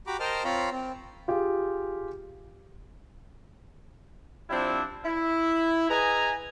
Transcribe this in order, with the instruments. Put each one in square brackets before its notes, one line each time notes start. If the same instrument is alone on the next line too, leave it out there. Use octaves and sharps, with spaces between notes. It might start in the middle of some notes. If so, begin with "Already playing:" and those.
[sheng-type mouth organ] F#4 G4 A#5 B5 D6
A#4 C5 D#5 G5 A5 F6
C4 F4 C#5 F5 A#5 B5
C4
[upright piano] F4 G4 G#4
[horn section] F3 G3 C4 D4 E4
E4
G#4 B4 D#5 G#5 A#5